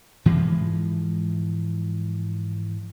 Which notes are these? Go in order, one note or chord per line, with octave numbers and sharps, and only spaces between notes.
G#2 E3 F3 G#3